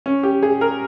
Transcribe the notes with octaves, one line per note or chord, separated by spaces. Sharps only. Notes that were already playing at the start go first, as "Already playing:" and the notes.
C#4
G4
G#4
A#4